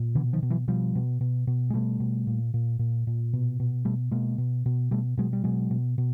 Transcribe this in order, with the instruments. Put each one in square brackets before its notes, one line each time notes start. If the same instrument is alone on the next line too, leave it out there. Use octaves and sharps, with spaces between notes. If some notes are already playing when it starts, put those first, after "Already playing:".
Already playing: [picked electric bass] A#2
B2 D3 E3
D#3 F3
B2
E3 F#3
B2 F3 G3
B2
B2
B2
G#3
B2 G3 A3
B2
A#2
A#2
A#2
A#2
B2
B2
B2 G3 A3
B2 G#3 A#3
B2
B2
B2 G3 A3
B2 F#3 G#3
G3
B2 F#3 G#3
B2
B2